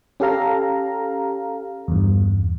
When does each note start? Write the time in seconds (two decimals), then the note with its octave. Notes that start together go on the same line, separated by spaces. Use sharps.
0.20 C#4 G4 A4 F5 A#5
1.88 E2 G2